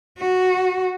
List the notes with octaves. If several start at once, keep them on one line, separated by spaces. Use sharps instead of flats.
F#4